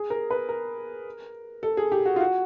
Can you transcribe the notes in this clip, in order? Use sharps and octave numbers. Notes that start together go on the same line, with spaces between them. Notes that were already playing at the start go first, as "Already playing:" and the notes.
Already playing: G#4
A#4
B4
A#4
A4
G#4
G4
F#4
F4
F#4